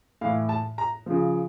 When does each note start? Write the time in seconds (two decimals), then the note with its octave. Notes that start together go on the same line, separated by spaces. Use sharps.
0.21 A2 E3 F5
0.49 A5
0.78 A#5
1.06 C#3 F3